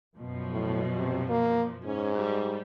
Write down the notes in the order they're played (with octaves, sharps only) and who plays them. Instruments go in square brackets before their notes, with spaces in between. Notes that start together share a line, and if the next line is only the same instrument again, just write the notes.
[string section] F#2 B2 F3
[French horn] A2
C3
A#3
[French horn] G#2 [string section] C#4
[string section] G3